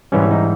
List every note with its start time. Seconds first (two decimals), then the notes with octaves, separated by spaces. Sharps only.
0.12 G#2 E3 G3 C#4
0.31 D#4